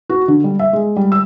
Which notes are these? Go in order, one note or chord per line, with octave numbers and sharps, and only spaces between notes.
F#4
D3
G3
E5
G#3
G3
E6